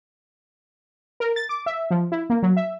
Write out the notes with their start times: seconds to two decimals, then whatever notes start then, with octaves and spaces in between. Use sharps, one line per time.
1.20 A#4
1.36 A6
1.49 D6
1.66 E5
1.91 F3
2.12 E4
2.30 A#3
2.43 F#3
2.57 E5